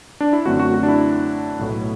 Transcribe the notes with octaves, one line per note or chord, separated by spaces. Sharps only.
D4
E4
F#2 D3 A3 C4 F#4
F#4
F#4
D4
E4
B1 A2 F#3 B3